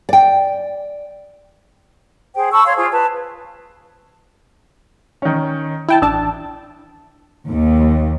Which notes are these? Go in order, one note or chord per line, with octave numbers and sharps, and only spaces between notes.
D5 G5
G#4 C5 G5
A5 B5 C#6 E6
C#5 F5 C6
F4 G#4 C5
B4 A5
D#3 C#4
E4 G5 A5
A1 D4 A5 E6
D#2